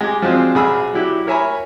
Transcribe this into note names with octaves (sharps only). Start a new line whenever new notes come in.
G#3 G4
F3 F#3 G#3 C4 D4
B1 G#4 B5 E6 F6
F#3 D4 E4 G4
A#4 C#5 E5 G#5 A#5 B5